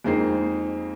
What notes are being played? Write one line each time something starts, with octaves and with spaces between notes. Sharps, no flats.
F2 G#3 A#3 C4 D#4 C7